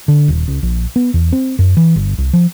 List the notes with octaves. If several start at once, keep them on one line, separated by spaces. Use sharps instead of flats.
D3
D#1
C#2
A#1
B3
E2
C4
F#2
E3
G1
C2
F3